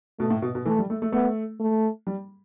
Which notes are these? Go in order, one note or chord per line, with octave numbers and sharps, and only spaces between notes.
B2 A3
A2
B2
B2
E3 A3
G3
A3
A3
A3 B3
A3
G3